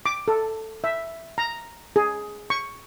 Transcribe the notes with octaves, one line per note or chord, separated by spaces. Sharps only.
D6
A4
E5
A#5
G#4
C#6